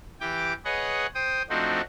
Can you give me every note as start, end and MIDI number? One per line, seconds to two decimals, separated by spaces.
0.20 0.53 52
0.20 0.53 67
0.20 0.53 79
0.20 0.53 86
0.65 1.06 68
0.65 1.06 71
0.65 1.06 73
0.65 1.06 75
0.65 1.06 78
1.15 1.42 72
1.15 1.42 79
1.15 1.42 87
1.49 1.81 53
1.49 1.81 57
1.49 1.81 60
1.49 1.81 62
1.49 1.81 63
1.49 1.81 66